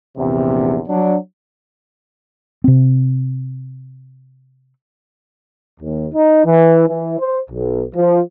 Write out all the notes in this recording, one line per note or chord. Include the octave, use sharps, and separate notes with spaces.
A#1 E2 C3
F#3 D4
C3 C4
D#2
D#4
E3
E3
C5
B1
F3